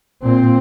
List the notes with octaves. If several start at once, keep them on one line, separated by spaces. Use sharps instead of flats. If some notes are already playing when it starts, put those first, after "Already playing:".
A#2 C4